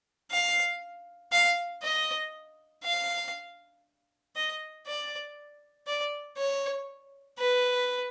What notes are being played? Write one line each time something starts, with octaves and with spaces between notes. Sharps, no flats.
F5
F5
D#5
F5
D#5
D5
D5
C#5
B4